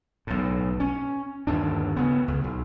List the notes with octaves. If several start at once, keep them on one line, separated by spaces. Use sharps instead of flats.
B1 A2
C#4
G1 D#2 D4
C#3 B3
C#2
B1